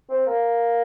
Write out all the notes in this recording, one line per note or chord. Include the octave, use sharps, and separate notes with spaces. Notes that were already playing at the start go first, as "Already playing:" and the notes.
C4
A#3